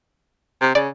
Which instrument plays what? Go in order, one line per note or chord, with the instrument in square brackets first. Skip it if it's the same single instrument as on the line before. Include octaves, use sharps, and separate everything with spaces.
[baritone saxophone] C3
[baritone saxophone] C#3 [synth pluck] D5